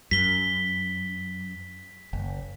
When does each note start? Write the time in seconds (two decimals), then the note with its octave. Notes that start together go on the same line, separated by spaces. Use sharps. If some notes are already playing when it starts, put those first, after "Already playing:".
0.11 F#2 B6 G7
2.13 F#1